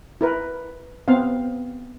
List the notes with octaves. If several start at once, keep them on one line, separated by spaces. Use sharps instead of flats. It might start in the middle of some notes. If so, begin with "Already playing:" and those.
E4 A#4 B4
B3 C4 F5